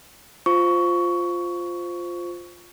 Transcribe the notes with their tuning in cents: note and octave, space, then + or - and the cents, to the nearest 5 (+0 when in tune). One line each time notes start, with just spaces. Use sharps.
F4 +5 C5 -5 C#6 +15